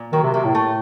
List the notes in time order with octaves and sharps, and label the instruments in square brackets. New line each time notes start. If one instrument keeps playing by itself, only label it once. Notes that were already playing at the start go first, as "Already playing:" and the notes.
Already playing: [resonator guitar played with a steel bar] A#2
[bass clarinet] D#3 [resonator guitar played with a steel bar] F#3
[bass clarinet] C3
[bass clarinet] C3 [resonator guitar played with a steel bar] A#3
[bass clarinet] A2
[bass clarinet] A2 [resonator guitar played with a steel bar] A3